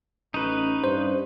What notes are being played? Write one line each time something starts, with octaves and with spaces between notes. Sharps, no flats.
A1 C#4 D#4 B4
G2 C5